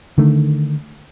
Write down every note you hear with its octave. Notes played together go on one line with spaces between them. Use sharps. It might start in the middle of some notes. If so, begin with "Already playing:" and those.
D3 D#3 A3